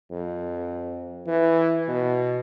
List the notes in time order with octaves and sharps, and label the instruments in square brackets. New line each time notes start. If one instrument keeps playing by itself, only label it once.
[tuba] F2
E3
B2